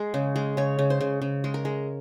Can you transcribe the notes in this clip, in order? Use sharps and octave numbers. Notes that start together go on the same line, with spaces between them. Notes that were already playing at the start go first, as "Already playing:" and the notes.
Already playing: G#3
C#3
G#3
C#3 C#5
C#3
C5
C#3
C#3
G#3
A#4
G#3